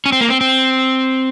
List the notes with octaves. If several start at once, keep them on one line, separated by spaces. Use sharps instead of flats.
C#4
C4
A#3
C4
C4